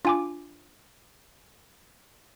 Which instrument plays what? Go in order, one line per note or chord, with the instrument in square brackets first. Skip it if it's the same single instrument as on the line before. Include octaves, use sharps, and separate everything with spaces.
[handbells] D4 G#5 D6 [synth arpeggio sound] F4